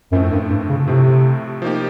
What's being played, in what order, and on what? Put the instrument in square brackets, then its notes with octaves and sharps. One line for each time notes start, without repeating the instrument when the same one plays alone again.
[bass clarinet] F#2 [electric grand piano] A2 F3 A3 C4
[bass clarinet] G2
G2
C#3
[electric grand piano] A2 F3 A3 C4 [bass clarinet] C3
[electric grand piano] F3 A#3 D#4 G4